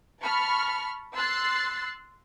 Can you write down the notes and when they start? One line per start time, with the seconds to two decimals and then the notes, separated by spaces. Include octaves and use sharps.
0.22 A5 B5 C#6 F6
1.15 C6 E6 F#6 A6 C7